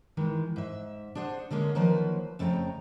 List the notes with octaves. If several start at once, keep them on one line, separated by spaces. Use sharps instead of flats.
D#3 E3 G#3
G#2 E5
D4 G#4 C5 F#5
D3 G#3 A#3 C#4
D#3 F3 F#3 A#3 B4 C5
F2 C#3 A3 G5 A5 A#5